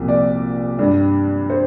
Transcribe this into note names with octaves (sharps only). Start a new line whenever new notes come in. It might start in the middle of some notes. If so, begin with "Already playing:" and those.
Already playing: C2 A#2 F3 A#3
D5
G2 G3 D4
C5